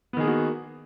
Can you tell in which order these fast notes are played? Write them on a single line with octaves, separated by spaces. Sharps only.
B3 D#3 G#4 A#3 F#4